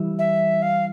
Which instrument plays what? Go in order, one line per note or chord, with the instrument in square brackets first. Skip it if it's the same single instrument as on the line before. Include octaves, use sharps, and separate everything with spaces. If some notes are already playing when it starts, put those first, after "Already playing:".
Already playing: [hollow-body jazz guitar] E3 G3 E4
[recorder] E5
F5